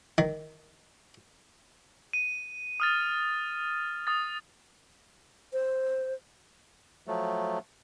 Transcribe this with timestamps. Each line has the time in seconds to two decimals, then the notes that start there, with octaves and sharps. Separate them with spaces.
0.18 D#3
2.13 D#7
2.80 D#6 F6 A6
4.07 D#6 A6
5.53 C5
7.07 F3 F#3 A3